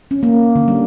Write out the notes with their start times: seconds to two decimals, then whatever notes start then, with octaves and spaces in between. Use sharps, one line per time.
0.11 C#4
0.23 A#3
0.55 D3
0.68 G3